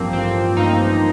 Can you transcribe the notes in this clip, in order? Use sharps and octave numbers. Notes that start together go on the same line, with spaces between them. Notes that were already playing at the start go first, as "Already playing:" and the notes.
Already playing: A1 G2 F3 A#3 C4
A1 C4
G2 F3 D#4